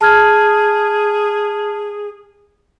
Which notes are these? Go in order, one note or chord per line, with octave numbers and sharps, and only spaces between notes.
G#4 A5 F6 G#6